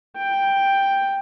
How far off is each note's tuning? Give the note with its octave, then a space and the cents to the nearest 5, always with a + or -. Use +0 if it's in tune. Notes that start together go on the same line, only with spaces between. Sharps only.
G5 +5